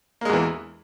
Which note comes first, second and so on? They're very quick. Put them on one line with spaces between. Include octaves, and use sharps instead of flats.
A#3 G#3 E2 E3